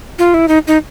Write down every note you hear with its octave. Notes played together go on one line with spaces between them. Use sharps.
F4
E4
D#4
D#4